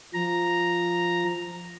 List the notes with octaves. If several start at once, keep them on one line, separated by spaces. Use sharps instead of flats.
F3 A#5